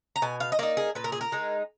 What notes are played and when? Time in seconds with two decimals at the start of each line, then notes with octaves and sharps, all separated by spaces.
0.16 A#5
0.22 B2 G#5
0.40 F5
0.52 D#5
0.59 A#3 D#4 D5
0.77 G#4
0.95 A#2 B4
1.04 A#4
1.12 G#4
1.21 A#4
1.32 G#3 D#4